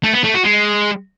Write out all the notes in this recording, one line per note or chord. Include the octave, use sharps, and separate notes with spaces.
A3
B3
A3
F#4
G#3